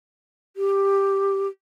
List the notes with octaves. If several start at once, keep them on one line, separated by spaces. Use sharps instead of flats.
G4